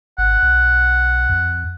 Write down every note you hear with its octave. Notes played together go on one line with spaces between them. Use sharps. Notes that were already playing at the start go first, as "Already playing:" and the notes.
G#1 F#5
B1
F2